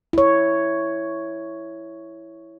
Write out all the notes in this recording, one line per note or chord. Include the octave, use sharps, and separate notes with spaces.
E4 C#5